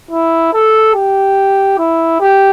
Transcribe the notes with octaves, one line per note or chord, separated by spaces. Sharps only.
E4
A4
G4
E4
G4